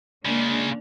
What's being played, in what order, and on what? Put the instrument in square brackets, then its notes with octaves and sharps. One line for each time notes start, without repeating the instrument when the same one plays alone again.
[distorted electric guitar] C#3 G#3 [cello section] A#3 D4